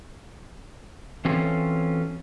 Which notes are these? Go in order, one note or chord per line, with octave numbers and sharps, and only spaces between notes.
E3 C4 C#4 F4 F#4 A4